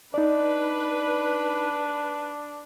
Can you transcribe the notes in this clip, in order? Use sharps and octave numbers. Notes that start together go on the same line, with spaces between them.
D4 D#4 B4 D5